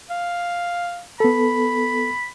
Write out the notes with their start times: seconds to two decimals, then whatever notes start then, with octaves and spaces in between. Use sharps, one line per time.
0.11 F5
1.20 B3 A4 B5